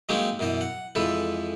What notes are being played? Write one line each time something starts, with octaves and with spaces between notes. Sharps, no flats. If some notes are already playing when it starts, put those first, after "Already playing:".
F#3 G#3 A#3 C4 C#4 D#4
F#2 B2 E3 D#5
F#5
F2 E3 G#3 A4 B4